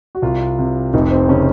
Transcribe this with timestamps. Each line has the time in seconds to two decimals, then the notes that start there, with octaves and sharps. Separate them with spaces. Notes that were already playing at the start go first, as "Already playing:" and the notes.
0.15 F#4
0.22 C2 F4
0.58 C3
0.94 F1 D#4
1.11 C4
1.29 C#3 C#4